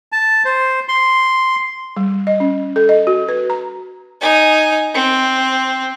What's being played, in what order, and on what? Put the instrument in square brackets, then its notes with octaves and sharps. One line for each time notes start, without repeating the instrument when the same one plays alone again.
[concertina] A5
C5
C6
[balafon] G3
D#5
C#4
A4
D#5
F#4
B4
A#5
[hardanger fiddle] D#4 G#5
C4